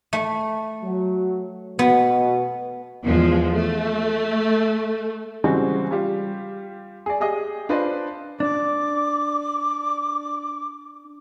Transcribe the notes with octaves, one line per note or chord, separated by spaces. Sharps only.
A3
F#3
B2 B3
E2 F3 G#3
A3
C#3 E3 G3 G#3 C4 F#4
G3 F4 G4
G#4 D5
G4 G#4 D#5 D#6
D4 F4 B4 C5 D5 D#5
D4 D6